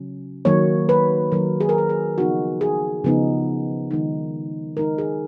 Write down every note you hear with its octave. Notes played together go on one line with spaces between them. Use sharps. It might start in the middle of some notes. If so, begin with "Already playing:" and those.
Already playing: C#3 F#3 C#4
D#3 F#3 A#3 C#5
B4
D#3 F#3 A#3 A#4
G#4
A#4
G#4
G#4
C#3 F3 B3 D#4 F#4
G#4
C#3 F3 B3 D#4
D#3 G#3 D#4
D#3 G#3 D#4 A#4
G#4